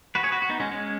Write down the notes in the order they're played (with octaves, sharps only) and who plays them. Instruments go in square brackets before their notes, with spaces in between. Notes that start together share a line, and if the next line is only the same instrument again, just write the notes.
[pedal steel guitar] F#4 B4
G#4 C#5
F#4 B4
F#4
B3 D#4
G#3 C#4
G#3 C#4